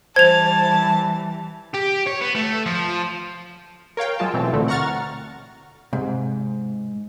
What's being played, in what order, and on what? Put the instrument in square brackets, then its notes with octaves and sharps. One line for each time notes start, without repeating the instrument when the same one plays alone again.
[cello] E3 G3 [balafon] C5 [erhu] A5 [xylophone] G#6 F7
[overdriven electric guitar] G4
C#5
B3
A3
F3
[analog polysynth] A#4 C#5 F5 G5
F#3 G#3 F4 A5
B2 E3 A3 C4
D2 A#2 D3 A3 C4
F#5 A#5 C#6 F6 A6
[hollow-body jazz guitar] G#2 [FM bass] C3